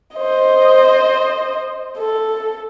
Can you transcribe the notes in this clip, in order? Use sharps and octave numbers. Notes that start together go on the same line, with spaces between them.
C5 D#5
A4